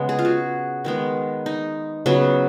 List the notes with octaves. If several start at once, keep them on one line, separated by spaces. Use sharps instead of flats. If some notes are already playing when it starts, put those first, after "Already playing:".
Already playing: C#3 G#3 B3
G#4
F4
F#4
D#3 G#3 B3
D#4
C#3 F#3 B3